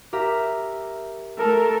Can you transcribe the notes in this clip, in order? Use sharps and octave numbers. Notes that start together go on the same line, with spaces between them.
G4 A#4 E5
A3 A4 A#4